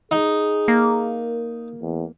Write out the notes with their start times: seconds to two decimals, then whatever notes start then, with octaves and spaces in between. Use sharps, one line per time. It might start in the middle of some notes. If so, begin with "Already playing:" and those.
0.11 D#4 G#4
0.68 A#3
1.82 E2